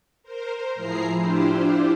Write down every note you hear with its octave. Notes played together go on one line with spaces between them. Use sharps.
A#4 C5
A2 F3 E4 G#4 A#5 C7
D4 E4 F4 G4 C5